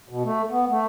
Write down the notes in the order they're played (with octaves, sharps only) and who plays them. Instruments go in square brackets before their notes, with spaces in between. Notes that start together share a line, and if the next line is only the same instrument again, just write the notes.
[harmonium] B2
A3
B3
A3